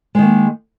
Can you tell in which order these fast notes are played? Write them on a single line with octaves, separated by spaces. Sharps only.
G#3 D#3 A#3